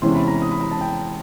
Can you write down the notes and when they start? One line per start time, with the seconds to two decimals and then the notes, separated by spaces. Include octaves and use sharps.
0.02 E2 C3 E3 G#3 C#4 C6
0.15 B5
0.28 A#5
0.42 D#6
0.51 B5
0.61 A#5
0.71 A5
0.81 G5